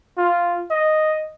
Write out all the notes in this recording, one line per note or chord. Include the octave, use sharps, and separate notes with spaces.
F4
D#5